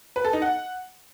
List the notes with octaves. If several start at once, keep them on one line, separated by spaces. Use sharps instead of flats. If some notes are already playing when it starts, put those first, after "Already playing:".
B4
A4
D#4
F#5